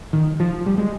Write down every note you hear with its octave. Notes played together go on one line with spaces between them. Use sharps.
D#3
F3
G3
G#3